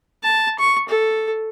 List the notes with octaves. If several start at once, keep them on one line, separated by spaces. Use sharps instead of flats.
A5
C#6
A4